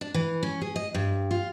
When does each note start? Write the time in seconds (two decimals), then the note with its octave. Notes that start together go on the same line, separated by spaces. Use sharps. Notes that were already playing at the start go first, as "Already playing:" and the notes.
0.01 D4
0.14 E3
0.43 C#4
0.61 G#4
0.76 D#5
0.94 G2
1.31 F4